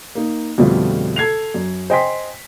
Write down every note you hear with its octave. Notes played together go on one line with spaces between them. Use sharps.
A#3 D#4
F2 B2 D3 G3 A3 F4
A4 G#6 C7 F7
F#2
C5 D#5 G5 G#5 C6 B6